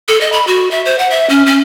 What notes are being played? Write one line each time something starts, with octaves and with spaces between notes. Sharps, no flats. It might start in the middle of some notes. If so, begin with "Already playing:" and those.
A4
D#5
B5
F#4
E5
C5
F#5
E5
C#4
C#4